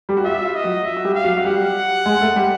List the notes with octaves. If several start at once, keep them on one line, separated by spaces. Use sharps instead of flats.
G3 G4
F#4
F4 E5
F4
D#5
F#3 F#4
E5
F#4
G3 G4
F5
F#3 F#4
F#4
G3 G4 F#5
G#3 G#4
A3 A4
G3 G4